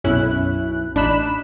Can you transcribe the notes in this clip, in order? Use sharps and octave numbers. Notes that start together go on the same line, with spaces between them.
B1 F#2 C#4 E4 F#6
A1 D4 D#4 B5 F#6 E7